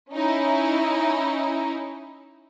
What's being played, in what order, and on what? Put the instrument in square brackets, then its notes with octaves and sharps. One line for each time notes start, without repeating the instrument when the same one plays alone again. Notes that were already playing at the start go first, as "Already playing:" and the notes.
[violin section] C#4 D#4 E4